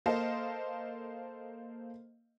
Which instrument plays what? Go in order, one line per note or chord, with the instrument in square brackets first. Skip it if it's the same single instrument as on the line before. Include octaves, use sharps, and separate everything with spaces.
[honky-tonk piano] A#3 A4 C5 D#5 F5